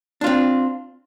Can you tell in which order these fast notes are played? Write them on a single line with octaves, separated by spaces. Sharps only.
D4 F4 C4